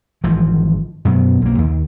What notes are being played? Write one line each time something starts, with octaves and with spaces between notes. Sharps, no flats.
G#1 E3 F3
F#2 B2 F#3 B3
B1 A#3
D#2